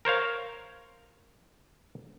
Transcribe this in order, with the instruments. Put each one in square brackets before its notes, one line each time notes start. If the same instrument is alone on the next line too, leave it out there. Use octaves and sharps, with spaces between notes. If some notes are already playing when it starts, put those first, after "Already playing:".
[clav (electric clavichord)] A#4 C5 C#5 F5